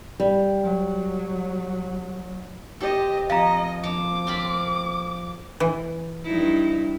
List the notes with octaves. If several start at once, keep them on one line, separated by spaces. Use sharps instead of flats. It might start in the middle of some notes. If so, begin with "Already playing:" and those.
G3
F#3
G4 A4 C5 D#5
F2 D#5 F5 A#5
F3 D6
C4 F4 B5
E3
G2 D#4 E4